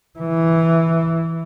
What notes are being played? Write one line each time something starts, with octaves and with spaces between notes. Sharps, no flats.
E3